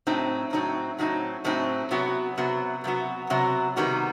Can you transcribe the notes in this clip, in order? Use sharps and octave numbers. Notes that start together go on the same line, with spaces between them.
A2 F#3 C4 D#4
A2 F#3 C4 D#4
A2 F#3 C4 D#4
A2 F#3 C4 D#4
C3 F#3 B3 F#4
C3 F#3 B3 F#4
C3 F#3 B3 F#4
C3 F#3 B3 F#4
C3 D#3 G3 B3 F#4